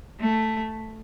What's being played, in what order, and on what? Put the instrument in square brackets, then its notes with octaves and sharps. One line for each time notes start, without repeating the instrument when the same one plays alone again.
[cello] A3